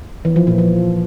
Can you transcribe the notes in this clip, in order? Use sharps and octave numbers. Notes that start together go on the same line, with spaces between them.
E3
F3
A#2
F3